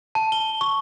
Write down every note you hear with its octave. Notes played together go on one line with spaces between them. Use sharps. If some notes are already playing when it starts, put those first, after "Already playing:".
A5
G7
C#6